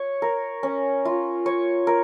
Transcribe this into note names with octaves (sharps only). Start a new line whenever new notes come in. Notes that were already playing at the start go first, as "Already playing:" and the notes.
Already playing: C#5
A#4
C#4
F4
C#5
A#4